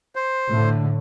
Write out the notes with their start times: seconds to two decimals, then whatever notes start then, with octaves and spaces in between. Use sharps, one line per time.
0.15 C5
0.49 A2 D3